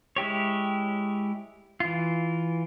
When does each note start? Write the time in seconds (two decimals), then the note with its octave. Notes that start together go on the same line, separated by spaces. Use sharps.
0.16 G#3 E4 G4 C#5
1.80 E3 F4